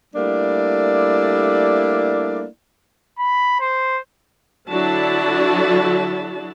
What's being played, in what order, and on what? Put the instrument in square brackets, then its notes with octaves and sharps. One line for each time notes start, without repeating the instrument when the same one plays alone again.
[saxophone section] G3 A3 A#3 D4 E4 D5
[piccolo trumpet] B5
C5
[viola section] D3 F#3 D4 E4 F#4 A5